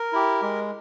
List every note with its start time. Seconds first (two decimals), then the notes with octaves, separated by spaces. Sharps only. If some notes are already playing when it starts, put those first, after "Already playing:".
Already playing: A#4
0.13 E4 G4
0.42 G#3